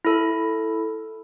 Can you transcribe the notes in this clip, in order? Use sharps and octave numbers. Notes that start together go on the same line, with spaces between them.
E4 A4